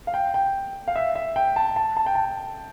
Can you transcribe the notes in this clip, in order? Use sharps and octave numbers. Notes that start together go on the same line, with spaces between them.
F5
G5
G5
F5
E5
E5
G5
A5
A5
A5
G5
A5